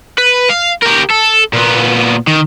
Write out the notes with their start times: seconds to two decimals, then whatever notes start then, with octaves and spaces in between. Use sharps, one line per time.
0.18 B4
0.49 F5
0.82 G4 A#4
1.10 A4
1.53 A#2 B3
2.27 D#3